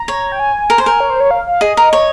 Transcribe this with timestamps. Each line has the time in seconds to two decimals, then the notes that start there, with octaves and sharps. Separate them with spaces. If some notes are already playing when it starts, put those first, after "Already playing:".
Already playing: A#5
0.08 C#5
0.32 G5
0.40 G#5
0.70 A#4
0.78 C5
0.86 A#4
1.00 C#5
1.10 C5
1.20 C#5
1.31 F5
1.47 F5
1.61 G#4 D#5
1.77 A#4
1.93 C#5